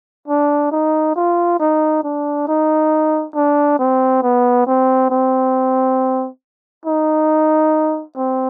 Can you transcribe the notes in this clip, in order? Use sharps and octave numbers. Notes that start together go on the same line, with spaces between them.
D4
D#4
F4
D#4
D4
D#4
D4
C4
B3
C4
C4
D#4
C4